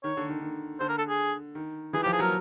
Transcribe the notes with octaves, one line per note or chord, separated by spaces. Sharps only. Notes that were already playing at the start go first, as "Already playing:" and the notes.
D#3 C#5
D3
D#3
D#3
D3 C5
A#4
A4
G#4
D#3
E3 G#4
G4
F3
G#4
F#3
A#4